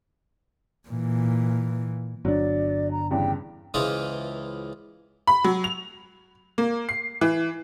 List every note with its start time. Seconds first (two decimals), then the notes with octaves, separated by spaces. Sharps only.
0.89 A#2 E3
2.25 G1 F#3 D4 D5
2.91 A#5
3.11 E2 G2 C#3 G5
3.74 C#2 E3 E4 F4 C5 D#6
5.27 B5
5.44 F#3
5.64 F7
6.58 A#3
6.89 C7
7.21 E3